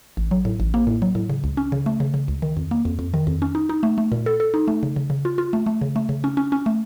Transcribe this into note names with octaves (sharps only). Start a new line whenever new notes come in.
A1
F#3
A2
A1
A#3
A2
F#3
A2
C#3
C#2
C#4
C#3
A3
C#3
C#3
C#2
D#3
F2
A#3
F2
F2
D#3
F2
C#4
D#4
D#4
A3
A3
A#2
A4
A4
D#4
A3
C#3
C#3
C#3
F4
F4
A3
A3
C#3
A3
C#3
C#4
C#4
C#4
A3